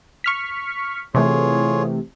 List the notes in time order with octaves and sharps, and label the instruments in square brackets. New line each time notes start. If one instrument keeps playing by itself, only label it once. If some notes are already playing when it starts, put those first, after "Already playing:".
[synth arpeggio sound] C#6 F6 B6
[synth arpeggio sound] C3 E3 A3 [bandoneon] F4 G#4 C#5